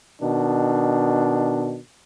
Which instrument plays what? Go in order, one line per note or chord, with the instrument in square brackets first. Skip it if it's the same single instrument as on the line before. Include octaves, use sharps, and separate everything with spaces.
[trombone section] B2 D#3 D4